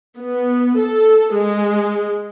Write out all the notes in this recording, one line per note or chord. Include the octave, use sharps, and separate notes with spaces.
B3
A4
G#3